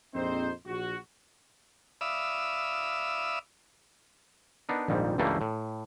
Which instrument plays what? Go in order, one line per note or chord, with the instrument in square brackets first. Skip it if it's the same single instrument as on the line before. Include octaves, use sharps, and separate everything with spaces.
[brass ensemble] A#1 F2 C4 D#4 C5
A#1 F#4
[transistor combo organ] D5 E5 F5 B5 D#6 E6
[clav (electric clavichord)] B3 D4 D#4 A#4
A#1 F2 G#2 D#3 G3
C#2 G2 E3 G3 A3 A#3
A2